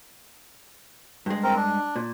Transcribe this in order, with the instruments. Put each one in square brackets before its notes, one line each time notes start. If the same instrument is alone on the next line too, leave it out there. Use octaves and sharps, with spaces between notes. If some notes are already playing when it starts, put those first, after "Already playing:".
[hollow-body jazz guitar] G2 G#3
[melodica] C4 A#4
D4
[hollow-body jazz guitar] A#2